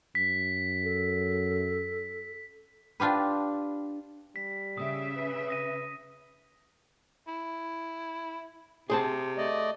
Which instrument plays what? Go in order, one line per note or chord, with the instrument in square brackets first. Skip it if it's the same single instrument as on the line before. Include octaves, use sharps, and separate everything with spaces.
[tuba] F#2 [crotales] B6
[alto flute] A4
[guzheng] D4 F4 G4 B4
[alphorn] G3 [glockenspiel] B6
[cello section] C#3 E5 [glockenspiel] D#6
[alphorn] B4
[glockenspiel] D#6 A#6 D#7
[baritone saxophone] E4
[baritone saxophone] C3 [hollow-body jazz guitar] G#4 C5 A5
[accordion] A3 D5 D#5